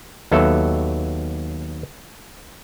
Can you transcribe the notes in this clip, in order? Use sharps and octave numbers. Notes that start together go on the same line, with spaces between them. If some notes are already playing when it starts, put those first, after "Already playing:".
D#2 F#3 B3 A4 E5